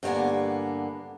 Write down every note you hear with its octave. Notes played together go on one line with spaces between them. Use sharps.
G2 D3 A#3 B3 G#5